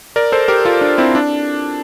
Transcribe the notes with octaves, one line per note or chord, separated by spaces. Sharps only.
A#4 D5
A4 C5
G4 A#4
F4 A4
D4
C4 E4
D4